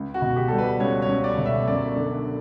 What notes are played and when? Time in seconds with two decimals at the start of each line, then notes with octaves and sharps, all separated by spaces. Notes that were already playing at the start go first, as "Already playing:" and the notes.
Already playing: C#2
0.14 F#4
0.22 B2
0.36 G4
0.48 G3 A4
0.58 B4
0.80 C#2 C#5
1.02 C#5
1.09 C#2
1.24 D5
1.38 B2
1.46 E5
1.67 F#2 D5
1.96 D3